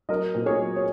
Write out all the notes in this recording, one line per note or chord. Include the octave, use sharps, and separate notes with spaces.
F#3 A#4 D#5
A#2
G#4 C#5
F#3
C#5